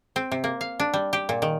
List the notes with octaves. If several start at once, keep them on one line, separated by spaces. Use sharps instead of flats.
C4
C3
A#3
F5
D4
G3
G4
A#2
D#3